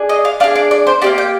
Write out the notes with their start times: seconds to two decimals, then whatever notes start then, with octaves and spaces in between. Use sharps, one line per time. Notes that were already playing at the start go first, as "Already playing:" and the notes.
Already playing: D4 G#4
0.09 D#5
0.25 F5
0.40 D4 F5
0.44 G#4
0.55 D5
0.71 D5
0.87 C5
1.02 A#3 D#4 G4 D5
1.18 G5